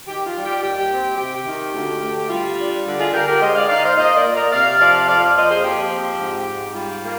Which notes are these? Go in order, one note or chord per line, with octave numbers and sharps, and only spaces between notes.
D#3 G4
F4
G3
G4
D#2 G4
C4
C3 G4
D#3
D2
D2
G3 F4
D4
D3
F4 G#4
D3 G4 A#4
G4 A#4
G#3 C5 D#5
D5 F5
D#4 D5 F5
C5 D#5
A#2 C5 D#5
A#4 D5
A#2
A#4 D5
C3 D5 F5
F3 D5 F5
F2 D5 F5
D5 F5
A#3 C5 D#5
G#4 C5
F3 G4
C4
G#2
G#2
G3 F4
A#3